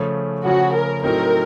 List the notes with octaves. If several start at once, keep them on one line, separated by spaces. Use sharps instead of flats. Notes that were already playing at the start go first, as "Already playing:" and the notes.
Already playing: C#3 F3 A3 C#4
C#3 F3 A3 C#4 F#4
A#4
A2 F#3 A3 C4 D#4 A#4